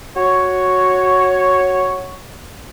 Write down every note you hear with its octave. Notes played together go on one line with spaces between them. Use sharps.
F#4 C#5